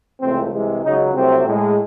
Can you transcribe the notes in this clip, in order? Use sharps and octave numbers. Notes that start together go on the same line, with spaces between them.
C#2 C3 E3 A3 C4
C2 C3 E3 G#3
C#2 C#3 F#3 D#4
C2 C3 F#3 A3 C4
A2 G#3